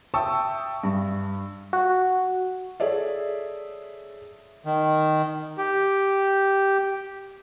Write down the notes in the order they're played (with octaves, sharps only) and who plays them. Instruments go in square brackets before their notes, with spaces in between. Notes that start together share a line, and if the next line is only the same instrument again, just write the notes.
[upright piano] E5 G5 A5 C#6 D#6 E6
G2
[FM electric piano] F#4
[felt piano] G#4 A4 C#5 D5 E5
[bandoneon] D#3
G4